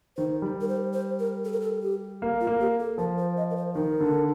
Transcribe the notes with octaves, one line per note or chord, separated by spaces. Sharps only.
D#3 C5
G3
A#4
C5
C5
A#4
A4
A#4
A4
G4
A#3
F4
A#3
G4
A4
F3 A#4
C5
D#5
A#4
C5
D#3 A#4
D3